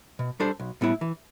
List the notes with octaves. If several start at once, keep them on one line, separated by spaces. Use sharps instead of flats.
B2
G3 D4 A4 C5
B1
A2 G3 B3 E4
E3